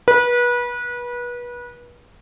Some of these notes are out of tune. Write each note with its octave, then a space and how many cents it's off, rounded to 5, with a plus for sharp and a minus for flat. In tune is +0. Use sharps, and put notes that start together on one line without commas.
B4 -30